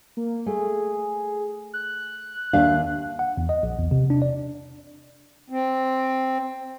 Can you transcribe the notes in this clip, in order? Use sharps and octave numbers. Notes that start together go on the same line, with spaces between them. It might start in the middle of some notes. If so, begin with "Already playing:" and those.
A#3
A3 G#4
F#6
D#2 D4 E5 F5
F#5
E2
D#5
A#1
E2
C3
D4
D5
C4